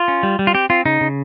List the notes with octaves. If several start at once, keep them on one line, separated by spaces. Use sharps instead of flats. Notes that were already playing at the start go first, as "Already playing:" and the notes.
Already playing: F4
C#4
G3
G3
F4
C4 G4
C4 F4
C#3 D#4
C#3